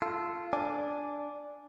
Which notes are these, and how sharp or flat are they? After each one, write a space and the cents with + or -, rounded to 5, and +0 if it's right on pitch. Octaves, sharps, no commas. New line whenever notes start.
F4 -15 A4 +0
D4 +0 D5 -10 G#5 +0